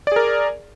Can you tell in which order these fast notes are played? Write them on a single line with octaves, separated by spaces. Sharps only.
D5 G#4 A#4